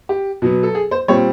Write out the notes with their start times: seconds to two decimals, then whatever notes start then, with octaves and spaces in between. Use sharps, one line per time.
0.09 G4
0.42 B2 F#3 B3
0.63 A4
0.75 G#4
0.91 C5
1.08 A#2 G3 C4 C#5